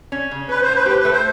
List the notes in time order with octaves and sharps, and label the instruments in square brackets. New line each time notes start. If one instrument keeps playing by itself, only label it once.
[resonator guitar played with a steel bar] C#4
C#3
[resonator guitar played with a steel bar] C#4 [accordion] B4
[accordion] C5
[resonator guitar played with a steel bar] A2
[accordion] B4
C5
[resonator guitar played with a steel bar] G4 [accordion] B4
[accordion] B4
[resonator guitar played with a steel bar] A3
[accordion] C5